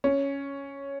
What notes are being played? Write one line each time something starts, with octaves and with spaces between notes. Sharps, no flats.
C#4